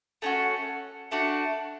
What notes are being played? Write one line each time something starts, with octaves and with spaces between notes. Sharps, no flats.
A3 C#4 F#4
A3 D4 F#4